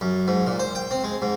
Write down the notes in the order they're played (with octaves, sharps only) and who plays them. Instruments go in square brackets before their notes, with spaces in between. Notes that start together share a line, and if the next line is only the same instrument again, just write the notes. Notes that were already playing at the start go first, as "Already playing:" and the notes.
[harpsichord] F#2
G#2
A#2
C5
G5
C4
G#3
G#2